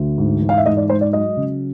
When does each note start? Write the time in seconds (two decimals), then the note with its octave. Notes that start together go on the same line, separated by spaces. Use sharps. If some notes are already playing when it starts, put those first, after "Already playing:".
Already playing: D2
0.18 G#2
0.41 E3
0.49 F5
0.57 E5
0.66 G#2 D#5
0.77 D5
0.89 G#3 C5
1.01 D5
1.13 F#3 D#5
1.37 C#3